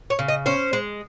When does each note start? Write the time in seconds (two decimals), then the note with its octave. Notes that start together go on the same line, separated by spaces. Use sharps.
0.10 C#5
0.19 C#3
0.28 D#5
0.46 C#4 C5
0.73 G#3